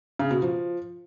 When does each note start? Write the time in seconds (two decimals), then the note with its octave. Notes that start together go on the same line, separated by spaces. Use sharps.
0.19 C#3
0.31 B2
0.42 F3